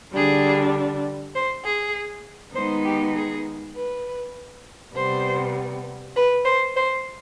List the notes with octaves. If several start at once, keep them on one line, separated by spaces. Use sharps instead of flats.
D3 G3 D4 G#4
C5
G#4
D#3 G#3 B3 D#4 C5
G4
G#4
B4
C3 G3 B3 C5
B4
C5
C5